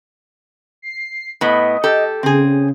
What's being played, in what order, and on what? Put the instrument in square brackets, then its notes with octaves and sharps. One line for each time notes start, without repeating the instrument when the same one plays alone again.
[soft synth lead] C7
[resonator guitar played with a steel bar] A2 B3 [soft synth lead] D#5
[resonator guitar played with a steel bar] G4 A4
[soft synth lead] C#3 [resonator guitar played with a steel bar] C4 G#4